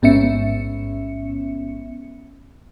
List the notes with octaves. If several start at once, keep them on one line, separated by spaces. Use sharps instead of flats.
A1 G#2 B3 C#4 E5 C#7